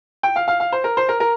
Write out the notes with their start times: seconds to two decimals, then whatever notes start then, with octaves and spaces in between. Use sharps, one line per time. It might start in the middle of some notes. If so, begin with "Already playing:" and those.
0.23 G5
0.36 F5
0.48 F5
0.60 F5
0.72 C5
0.84 A#4
0.97 C5
1.09 A#4
1.20 A#4